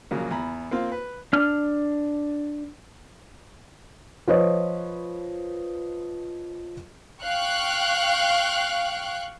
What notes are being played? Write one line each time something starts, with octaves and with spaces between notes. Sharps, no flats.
A#1 C#3 F#3 A#3
E2 A#5 B5
A#3 C4 F4
B4
D4 F6
F3 B4 C#5 D#5
F5 G5 C#6 F#6